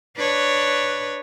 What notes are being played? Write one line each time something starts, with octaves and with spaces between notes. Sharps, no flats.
D4 B4 C#5